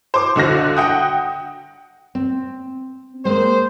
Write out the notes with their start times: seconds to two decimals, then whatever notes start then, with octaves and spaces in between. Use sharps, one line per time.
0.14 C5 D6
0.36 C#2 D3 F#4 A#6
0.77 F#5 G5 D#6
2.15 C4
3.25 G#3 A#3 C5